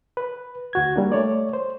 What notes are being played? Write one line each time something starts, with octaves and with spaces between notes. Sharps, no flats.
B4
D2 F#4 G#6
G3 A#3 D4
A3 C#5 D5
C5